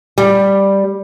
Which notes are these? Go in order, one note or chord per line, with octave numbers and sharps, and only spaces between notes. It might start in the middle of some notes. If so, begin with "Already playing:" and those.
G3